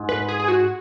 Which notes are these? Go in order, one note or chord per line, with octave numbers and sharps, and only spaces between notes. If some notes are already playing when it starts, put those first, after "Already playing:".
Already playing: G#2
B4
G#4
G#4
F#4